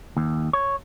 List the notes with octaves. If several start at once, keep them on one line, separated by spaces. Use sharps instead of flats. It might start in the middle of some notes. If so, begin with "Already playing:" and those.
D#2
C#5